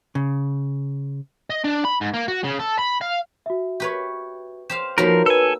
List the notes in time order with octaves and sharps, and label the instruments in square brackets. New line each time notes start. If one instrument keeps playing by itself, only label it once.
[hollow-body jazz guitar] C#3
[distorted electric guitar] D#5
D4
B5
G#2
A#3
F#4
C#3
A4
B5
F5
[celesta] F#4 E5
[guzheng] G4 B4 C#5
[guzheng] G4 C5 F5 [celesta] E7
[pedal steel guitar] F3 A#4 [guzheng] A#3 B3 G4 [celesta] D#4 F#4 C#5
[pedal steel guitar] A4 G#5 [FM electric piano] B4 E6